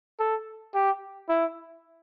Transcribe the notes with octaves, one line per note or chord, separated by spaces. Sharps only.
A4
G4
E4